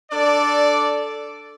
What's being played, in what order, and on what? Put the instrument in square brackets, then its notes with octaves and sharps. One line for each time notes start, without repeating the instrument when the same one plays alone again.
[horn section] D4 A4 D5